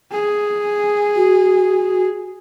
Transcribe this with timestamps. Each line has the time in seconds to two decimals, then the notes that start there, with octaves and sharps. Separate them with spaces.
0.12 G#4
1.16 F#4